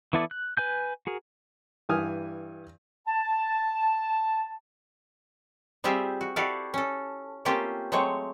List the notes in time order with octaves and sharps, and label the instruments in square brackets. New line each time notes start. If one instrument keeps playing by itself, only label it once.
[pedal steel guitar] E3 B3 E4 A4 D5
F#6
B4 G#5 G6
F#4 G#4 A#4
[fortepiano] G2 E3 G#5 D#6 F6
[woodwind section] A5
[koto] G3 C4 F4 G4 G#4 E5
F#4
E4 F#4 G4 A4 D5 F5
C#4 A4
A3 A#3 C4 C#4 F4 G4
F#3 G#3 A3 C4 C#5